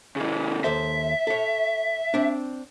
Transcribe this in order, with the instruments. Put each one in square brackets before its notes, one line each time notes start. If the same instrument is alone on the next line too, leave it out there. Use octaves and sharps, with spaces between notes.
[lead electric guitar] C#3 E3
[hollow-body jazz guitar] D#2 A4 C5 [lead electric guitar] E5
[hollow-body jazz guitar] A4 C#5
C4 D4